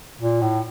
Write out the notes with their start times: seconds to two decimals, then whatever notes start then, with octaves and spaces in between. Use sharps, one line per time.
0.21 A#2
0.41 A2